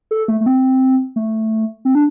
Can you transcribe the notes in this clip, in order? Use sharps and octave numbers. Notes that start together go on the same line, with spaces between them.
A4
A3
A3
C4
A3
C4
D4